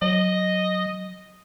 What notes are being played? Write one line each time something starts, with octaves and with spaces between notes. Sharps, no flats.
F#3 D#5